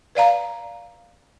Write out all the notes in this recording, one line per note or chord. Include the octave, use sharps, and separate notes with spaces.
B4 D5 F5 A#5